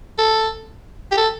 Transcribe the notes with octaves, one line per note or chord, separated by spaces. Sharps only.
A4
G4
A4